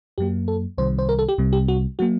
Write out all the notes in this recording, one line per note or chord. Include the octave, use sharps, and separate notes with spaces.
F#2 F#3 A#3 G4
A4
C2 C3 D#3 G3 C5
C5
A#4
A4
G4
C2 C3 G3
G4
F#4
F#3 A#3 F#4